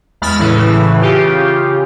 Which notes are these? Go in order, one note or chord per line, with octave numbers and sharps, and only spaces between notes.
E2 G#3 B5 F6 A6
A2 C#3 E3
C#3 F4 G4